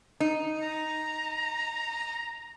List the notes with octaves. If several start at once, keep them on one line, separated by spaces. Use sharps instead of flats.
D#4
A#5